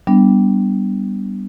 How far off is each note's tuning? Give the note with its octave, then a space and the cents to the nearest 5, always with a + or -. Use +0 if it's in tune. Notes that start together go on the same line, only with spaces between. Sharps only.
G3 +0 B3 +0 D4 +0